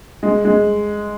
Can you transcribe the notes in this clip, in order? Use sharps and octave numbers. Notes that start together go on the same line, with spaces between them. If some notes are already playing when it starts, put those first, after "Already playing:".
G#3
G#3